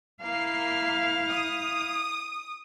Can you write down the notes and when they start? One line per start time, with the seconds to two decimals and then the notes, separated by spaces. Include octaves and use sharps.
0.22 A#3 E4 F5 C7
1.29 D#6